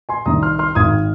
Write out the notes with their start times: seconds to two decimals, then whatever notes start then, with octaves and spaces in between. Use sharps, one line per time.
0.09 G#5 C6
0.26 C2 C3 D#3 A#5 D#6
0.42 C6 F6
0.59 C6 F6
0.75 G#1 G#2 D#3 D#6 G#6